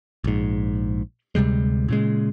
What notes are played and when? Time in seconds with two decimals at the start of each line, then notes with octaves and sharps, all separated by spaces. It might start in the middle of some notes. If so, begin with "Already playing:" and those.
0.24 A#1 G#2
1.35 D2 C3 G3 G#3
1.88 A#2 C#3 G#3